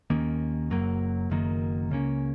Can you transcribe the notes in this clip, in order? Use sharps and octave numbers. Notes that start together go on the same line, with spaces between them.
D#2 D#3 A#3 C#4
F#1 F#2 F#3 A#3
F#1 F#2 D#3 A#3
C#2 C#3 A#3 C#4